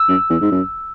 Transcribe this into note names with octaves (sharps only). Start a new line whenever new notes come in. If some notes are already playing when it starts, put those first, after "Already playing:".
Already playing: E6
F#2
E2
G#2
F#2